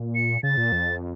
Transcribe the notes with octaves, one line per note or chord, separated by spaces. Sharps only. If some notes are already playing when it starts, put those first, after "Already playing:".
Already playing: A#2
C#7
C#3 A6
A#2
F2